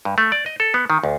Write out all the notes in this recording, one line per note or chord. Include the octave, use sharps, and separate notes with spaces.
G2
A3
D5
D#5
A4
B3
D#3
D2